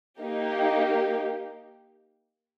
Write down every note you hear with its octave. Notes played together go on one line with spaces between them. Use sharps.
A#3 D#4 G4